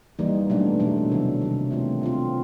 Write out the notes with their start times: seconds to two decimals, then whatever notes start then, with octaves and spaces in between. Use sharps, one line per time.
0.19 E3 G3 A#3 D#4
0.49 B2 F#3 A3 D4
0.80 B2 F#3 A3 D4
1.10 C3 D#3 F#3
1.41 C3 D#3 F#3
1.71 A3 C4 F4
2.01 A3 C4 F4